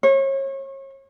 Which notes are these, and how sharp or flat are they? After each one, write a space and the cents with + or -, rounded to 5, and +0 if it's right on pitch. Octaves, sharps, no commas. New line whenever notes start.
C#5 -35